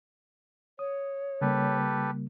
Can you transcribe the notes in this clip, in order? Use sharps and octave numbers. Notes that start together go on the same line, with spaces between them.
C#5 D#6
C#3 G3 A#3 G4 A4 B4